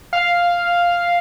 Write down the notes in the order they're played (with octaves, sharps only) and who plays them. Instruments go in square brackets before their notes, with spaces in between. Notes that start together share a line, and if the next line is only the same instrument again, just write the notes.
[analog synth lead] F5